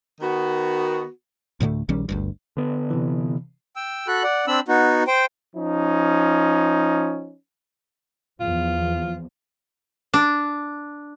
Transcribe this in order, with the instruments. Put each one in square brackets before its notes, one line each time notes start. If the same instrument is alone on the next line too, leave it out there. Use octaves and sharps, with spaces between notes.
[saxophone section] D#3 B3 F#4
[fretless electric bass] D2 A2 D3 A3
A#1 D#3 G3 C#4
G1 D2 G2
[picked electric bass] D3 B3
[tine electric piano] C3 E3
[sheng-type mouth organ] G5 E6
F#4 A4 B5 F#6
D5 F#5
C4 D4 B5 E6
B3 D#4 F#4
C5 G5
[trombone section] F3 C#4 D#4
[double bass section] E2 F3 [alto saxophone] F4
[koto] D4